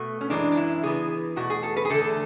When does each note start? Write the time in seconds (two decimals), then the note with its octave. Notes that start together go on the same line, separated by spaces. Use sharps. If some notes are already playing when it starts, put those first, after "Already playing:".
Already playing: B2 A3
0.21 C#4
0.30 F#2 E3 G#3 D4
0.51 D4
0.57 E4
0.83 C#3 E3 B3 G#4
1.36 E2 B2 A3 F#4
1.50 G#4
1.63 A4
1.77 B4
1.85 G#4
1.89 E2 D3 A3 A4